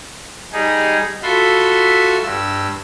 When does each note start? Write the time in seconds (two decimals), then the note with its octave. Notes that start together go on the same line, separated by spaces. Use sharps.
0.52 G3 D#4 G#4
1.23 F4 F#4 A4 E5 B5 C6
2.23 G2 E6